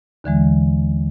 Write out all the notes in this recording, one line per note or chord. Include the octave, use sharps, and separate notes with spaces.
D#2 D3 E3 G#3